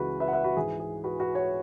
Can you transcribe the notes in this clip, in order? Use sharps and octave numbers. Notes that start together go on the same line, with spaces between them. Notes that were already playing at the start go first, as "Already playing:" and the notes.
Already playing: C#2 C#3 E3 F#4 B4
B4 E5
F#5
B4 E5
F#4 B4
G#2 E3 G#4
G#4
F#4 B4
F#4 B4
C#5 F#5